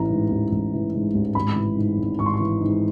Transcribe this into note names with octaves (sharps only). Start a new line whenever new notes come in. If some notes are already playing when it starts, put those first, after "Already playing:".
Already playing: A1 E3 A#5
G#2
A1
A1
E3
G#2
A1
G#1 B5
E3
G#2
G#1
G#1 C#6
C6
C#6
E3
G#2